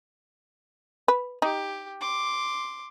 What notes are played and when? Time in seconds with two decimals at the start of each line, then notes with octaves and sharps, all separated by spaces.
1.08 B4
1.42 D#4 G4
2.01 C6 D6